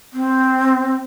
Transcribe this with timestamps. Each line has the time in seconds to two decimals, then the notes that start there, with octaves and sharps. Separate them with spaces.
0.13 C4